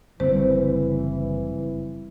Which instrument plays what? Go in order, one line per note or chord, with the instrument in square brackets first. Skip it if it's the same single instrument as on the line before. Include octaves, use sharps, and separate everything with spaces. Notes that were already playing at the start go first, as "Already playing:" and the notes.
[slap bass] F#1 D3 [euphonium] E3 [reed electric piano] G3 C4 [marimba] C5